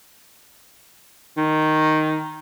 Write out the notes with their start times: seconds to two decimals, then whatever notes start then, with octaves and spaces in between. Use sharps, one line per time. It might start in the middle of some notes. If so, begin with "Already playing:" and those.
1.37 D#3